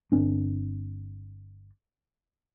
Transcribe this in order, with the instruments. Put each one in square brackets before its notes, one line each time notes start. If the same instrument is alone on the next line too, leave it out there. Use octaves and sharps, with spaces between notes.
[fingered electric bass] G1 C4 D4